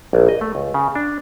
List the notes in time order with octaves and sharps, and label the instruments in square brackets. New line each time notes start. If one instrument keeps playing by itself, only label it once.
[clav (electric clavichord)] A#1
D#5
A3
C#2
C#3
D4